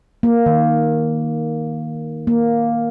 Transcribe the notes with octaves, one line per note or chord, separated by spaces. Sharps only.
A#3
D#3
A#3